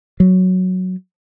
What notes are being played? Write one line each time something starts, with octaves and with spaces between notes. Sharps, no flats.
F#3